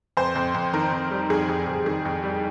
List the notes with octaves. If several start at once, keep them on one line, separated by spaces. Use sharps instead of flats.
F2 C5
F2
F2
D#3 A#4
F2
G3
F2 G#4
F2
F2
D#3 G#4
F2
G3